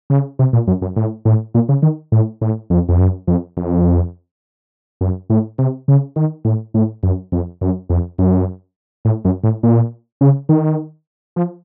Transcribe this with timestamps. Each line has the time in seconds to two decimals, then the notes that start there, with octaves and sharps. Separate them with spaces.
0.10 C#3
0.39 C3
0.53 A#2
0.67 F#2
0.82 F#2
0.96 A2
1.25 A2
1.54 A#2
1.69 C#3
1.82 D#3
2.12 A2
2.41 A2
2.70 F2
2.89 F2
2.99 F#2
3.27 F2
3.57 F2
5.01 F#2
5.30 A2
5.58 C3
5.88 C#3
6.16 D#3
6.45 A2
6.74 A2
7.03 F#2
7.32 F2
7.61 F#2
7.89 F2
8.18 F#2
9.05 A2
9.25 F#2
9.44 A2
9.63 A#2
10.21 C#3
10.49 D#3
11.36 F3